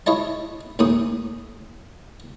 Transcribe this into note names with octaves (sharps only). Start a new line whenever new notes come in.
E4 C#5 D#5 A5
D#2 A2 C#4 D#6